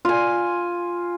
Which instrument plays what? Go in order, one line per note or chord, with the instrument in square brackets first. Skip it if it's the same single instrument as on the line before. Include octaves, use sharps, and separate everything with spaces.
[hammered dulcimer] F4 G#5